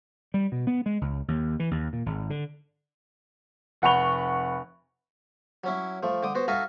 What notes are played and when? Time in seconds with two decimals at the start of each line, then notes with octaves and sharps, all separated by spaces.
0.34 G3
0.52 B2
0.67 B3
0.86 G#3
1.01 C#2
1.28 D#2
1.60 E3
1.71 D#2
1.93 A#2
2.06 G#1
2.30 D3
3.82 F1 F#5 B5 C#6 F7 G7
5.64 F#3 C#4 E4
6.03 F3 A3
6.23 D3 G5 D6 D#6
6.35 B3 F#4 C5
6.48 D#4 F#4 A4 E5 F5 G#5